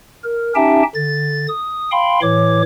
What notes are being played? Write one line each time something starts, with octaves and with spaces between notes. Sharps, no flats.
A#4
C#4 D#4 G4 E5 G5 A5
D3 A6
D#6
F5 G5 B5 C6
A2 E3 C#5 D6